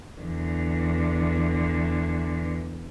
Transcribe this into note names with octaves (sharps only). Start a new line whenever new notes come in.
E2 D3